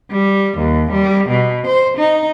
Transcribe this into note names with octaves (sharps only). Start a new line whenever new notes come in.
G3
D#2
G3
B2
C5
D#4